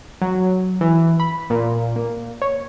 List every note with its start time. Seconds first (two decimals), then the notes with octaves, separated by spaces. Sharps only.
0.22 F#3
0.81 E3
1.20 B5
1.50 A#2
1.96 A#3
2.42 C#5